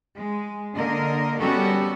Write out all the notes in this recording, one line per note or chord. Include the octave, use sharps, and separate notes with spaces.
G#3
D3 A#3 A#4 D#5
G3 B3 C#4 F#4 G4 A4